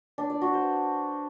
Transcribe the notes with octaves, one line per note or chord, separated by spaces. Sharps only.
D4
D5
F#4
C5